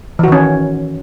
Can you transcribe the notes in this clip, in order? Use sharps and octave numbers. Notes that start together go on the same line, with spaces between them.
D#3 E3 C#4 F#4